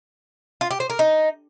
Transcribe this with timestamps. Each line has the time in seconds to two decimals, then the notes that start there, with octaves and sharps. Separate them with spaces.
0.61 F4
0.71 G4
0.80 C5
0.90 A#4
0.99 D#4